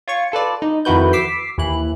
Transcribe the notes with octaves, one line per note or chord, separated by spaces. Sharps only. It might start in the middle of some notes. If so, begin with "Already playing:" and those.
F4 C#5 C#6
F4 A4 B4 D5
D#4
F2 D#3 E4 F#4 B4 G6
D6 E6 B6 C7
D#2 E3 E4 F#6